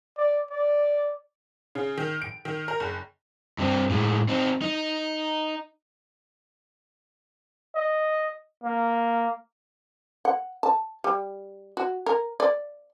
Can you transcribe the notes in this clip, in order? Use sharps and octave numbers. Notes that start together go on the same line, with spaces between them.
D5
D5
C#3
D#3
D7
D#3
A#4
F#1
G2 C4
A2 G#3
C4 D#4
D#4
D#5
A#3
F#5
A5
G3
F#4
A#4
D5